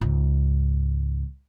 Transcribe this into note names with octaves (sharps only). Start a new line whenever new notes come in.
C#2 G#2